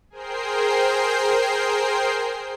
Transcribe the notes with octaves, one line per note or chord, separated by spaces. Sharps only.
G#4 A#4 C5 G5 C7